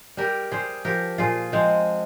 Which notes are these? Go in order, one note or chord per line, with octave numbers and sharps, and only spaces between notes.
G3 G4 A#4
G3 G#4 C5
F3 G4 A#4
A#2 F4 G#4
F3 G#3 C4